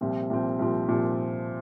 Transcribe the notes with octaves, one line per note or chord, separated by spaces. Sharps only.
C2 A#2 F3 C4 G4
C2 A#2 F3 C4 G4
C2 A#2 F3 C4 G4
C2 A#2 F3 C4 G4